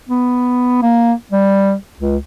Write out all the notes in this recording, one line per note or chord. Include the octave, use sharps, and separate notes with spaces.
B3
A#3
G3
C#2